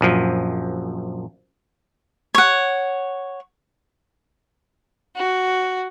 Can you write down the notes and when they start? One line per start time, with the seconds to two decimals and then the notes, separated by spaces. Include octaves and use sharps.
0.01 A#1 F#2 F3
2.35 C#5 F#5
5.16 F#4